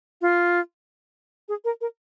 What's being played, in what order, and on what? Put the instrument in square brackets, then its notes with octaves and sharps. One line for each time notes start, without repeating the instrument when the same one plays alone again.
[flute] F4
G#4
A#4
A#4